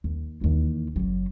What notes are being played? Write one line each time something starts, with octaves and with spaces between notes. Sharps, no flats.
D#2
D#2 E3
F#1 F#3